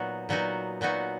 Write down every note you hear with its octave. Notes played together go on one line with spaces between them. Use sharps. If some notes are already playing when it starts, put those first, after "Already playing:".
Already playing: A#2 F#3 B3 D#4 F#4
A#2 F#3 B3 D#4 F#4
A#2 F#3 B3 D#4 F#4